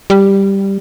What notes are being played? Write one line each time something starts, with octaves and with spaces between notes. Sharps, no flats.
G3